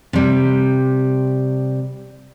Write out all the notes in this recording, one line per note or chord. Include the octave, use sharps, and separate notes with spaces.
C3 G3